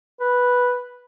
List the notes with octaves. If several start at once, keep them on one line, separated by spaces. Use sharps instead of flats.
B4